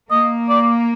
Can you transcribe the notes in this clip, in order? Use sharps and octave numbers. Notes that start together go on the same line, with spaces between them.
A#3 D#5
D5